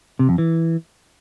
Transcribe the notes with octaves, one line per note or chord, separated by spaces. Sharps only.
C3
F2
E3